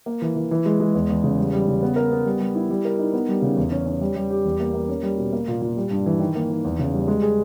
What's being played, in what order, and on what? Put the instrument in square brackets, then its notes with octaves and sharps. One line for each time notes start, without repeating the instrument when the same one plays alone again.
[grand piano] A#3
E3
E3
E3
G#3
G#3
E2
E2
C#3
G3
G3
C#3
B3
A#4
B3
G3
G3
E4
G3
A#4
D#4
B3
G3
C#3
E2
C#4
C#4
G3
G3
G4
E2
A#3
A#3
C#4
G3
B2
A#3
A#2
A#2
G3
G2
E3
D#3
A#3
D#3
E2
C#3
G3
G#3
G#4